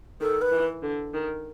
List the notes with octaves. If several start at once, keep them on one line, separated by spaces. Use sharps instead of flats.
D#3 A4
B4
E3
D3
D#3